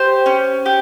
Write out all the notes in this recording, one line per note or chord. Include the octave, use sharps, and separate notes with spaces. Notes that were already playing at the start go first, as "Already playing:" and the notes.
Already playing: G4 C5
C#4
G4